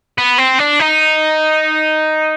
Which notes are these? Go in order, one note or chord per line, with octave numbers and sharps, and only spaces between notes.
B3
C4
D4
D#4